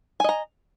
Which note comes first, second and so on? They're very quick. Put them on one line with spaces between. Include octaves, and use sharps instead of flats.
G#5 D#5 A#5